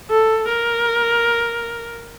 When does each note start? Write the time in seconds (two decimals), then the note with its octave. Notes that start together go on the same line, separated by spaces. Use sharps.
0.10 A4
0.49 A#4